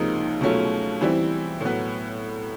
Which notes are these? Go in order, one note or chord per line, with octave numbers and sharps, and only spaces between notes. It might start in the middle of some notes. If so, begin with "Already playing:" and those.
Already playing: C#2 C3 F3 A#3 D#4
B2 F#3 A3 C#4 F4
E3 G3 C4 E4
A2 F#3 B3